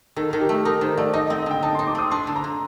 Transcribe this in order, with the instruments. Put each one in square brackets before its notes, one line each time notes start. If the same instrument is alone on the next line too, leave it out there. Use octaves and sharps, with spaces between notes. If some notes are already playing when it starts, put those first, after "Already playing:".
[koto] D#3 [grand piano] A4
[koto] D#3 [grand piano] A#4
[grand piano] G4
[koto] A3
[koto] D#4 [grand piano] A#4
[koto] D#3 [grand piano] C5
[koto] A3 [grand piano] D5
[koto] D#4 [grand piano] D#5
[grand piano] D#5
[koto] C4
[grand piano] D#5
[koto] D3 [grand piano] G5
[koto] D#4 [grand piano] A5
[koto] D#4 [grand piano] C6
[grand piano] D6
[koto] C4 [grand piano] D#6
[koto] D4 [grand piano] C6
[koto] D3
[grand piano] A#5
[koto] D3